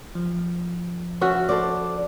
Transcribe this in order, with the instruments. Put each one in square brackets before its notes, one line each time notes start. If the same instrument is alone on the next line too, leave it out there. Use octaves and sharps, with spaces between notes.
[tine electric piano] F3
[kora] C#4 F#4 E5
[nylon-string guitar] A4 C5 D5